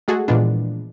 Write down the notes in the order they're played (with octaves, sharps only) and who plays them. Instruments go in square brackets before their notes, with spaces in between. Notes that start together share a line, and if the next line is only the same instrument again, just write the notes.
[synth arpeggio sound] G#3 A3 F#4 G#4 A4
A#2 E3 F3 G#3 B3 D4